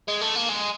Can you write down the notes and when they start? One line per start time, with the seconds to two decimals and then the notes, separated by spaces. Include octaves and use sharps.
0.08 G#3
0.21 A3
0.36 A#3
0.49 G#3